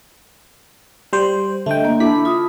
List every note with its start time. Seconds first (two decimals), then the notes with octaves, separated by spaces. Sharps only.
1.13 G3 C5
1.66 D3 A3 D#5 E5 G5
1.85 A#3
2.00 D4 E4 A4 B6
2.25 F4 D#6